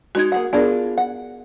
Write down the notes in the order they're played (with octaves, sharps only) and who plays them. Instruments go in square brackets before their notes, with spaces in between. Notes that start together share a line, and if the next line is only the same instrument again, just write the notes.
[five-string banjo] G#3 D#4 [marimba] F#4 G#6
[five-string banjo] A#3 G#4 F#5
[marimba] B3 G#4 A#4 [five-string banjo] D4 F4
[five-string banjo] F#5